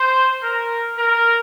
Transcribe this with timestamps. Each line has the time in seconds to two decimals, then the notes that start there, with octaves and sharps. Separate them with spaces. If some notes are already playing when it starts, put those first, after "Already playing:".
Already playing: C5
0.42 A#4
0.97 A#4